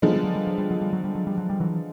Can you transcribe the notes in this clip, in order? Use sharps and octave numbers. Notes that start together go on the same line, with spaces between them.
D3 F3 F#3 G#3 B3
G3
F#3
G3
F#3
G3
F#3
G3
F#3
G3
F#3
G3
F#3
G3
E3 F#3